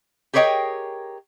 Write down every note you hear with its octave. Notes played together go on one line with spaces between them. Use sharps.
G4 G#4 A#4 C#5 D#5 G5